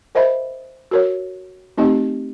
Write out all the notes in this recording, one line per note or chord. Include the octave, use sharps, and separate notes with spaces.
A#4 C5 D#5 E5 B5
F#4 A#4 C#5
A3 C4 D#4 G4 D#5